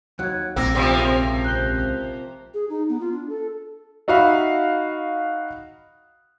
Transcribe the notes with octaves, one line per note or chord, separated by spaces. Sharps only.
D#2 F#3 F#6 G#6
A#1 A3 A#3 C4 E6 A#6
D2 C3 F3 A#3 C4 B5
C#2 C4 G#4
F#6 G6 G7
G#4
D#4
B3
F4
D4
A4
D#4 F#4 E5 F5 B5